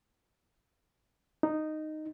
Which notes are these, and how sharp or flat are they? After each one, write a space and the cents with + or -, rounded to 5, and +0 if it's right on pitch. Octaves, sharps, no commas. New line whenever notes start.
D#4 -10